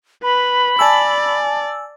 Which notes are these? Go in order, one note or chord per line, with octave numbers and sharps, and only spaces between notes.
B4 B5
D5 G#5 A5 E6